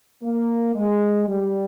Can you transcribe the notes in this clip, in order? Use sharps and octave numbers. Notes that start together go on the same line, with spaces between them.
A#3
G#3
G3